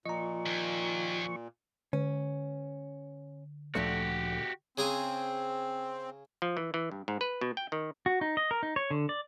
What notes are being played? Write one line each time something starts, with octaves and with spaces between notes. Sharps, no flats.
A#2 F3 D#5 A#5 C#6
D#2
D3 C#4
D2 A#2 D3 F3 A3 F#4 G4
C#3 C4 G#4 A#5
F3
E3
E3
G2
G#2
B4
B2
G5
D#3
F#4
D#4
D#5
A#4
D#4
C#5
D3
D5